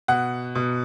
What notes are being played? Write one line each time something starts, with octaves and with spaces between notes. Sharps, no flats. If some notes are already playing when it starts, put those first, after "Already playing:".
B2 F#5
B2